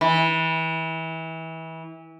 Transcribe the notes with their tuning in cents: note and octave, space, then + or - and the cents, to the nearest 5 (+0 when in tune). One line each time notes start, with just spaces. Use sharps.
E3 -25